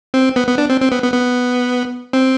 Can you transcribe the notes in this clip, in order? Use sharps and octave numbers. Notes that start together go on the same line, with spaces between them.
C4
B3
B3
D4
C4
C4
B3
B3
B3
C4